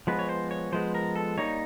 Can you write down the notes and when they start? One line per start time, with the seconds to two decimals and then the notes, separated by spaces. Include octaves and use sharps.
0.07 F3 G#3 B3 B4
0.19 C#5
0.29 C5
0.51 C#5
0.72 F3 G#3 B3 C5
0.95 A#4
1.16 A4
1.37 G3 A#3 D#4 C#5